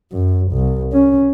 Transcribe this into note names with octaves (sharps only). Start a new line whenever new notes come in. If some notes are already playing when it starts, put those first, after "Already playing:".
F#2
C2
C#4